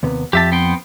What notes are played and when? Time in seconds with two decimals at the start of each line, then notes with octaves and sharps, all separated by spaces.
0.03 D#2 C3 B3
0.33 F2 G4 E5 A5
0.52 B3 C4 G5